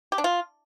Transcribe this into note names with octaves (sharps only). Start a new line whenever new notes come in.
G4
D4
F4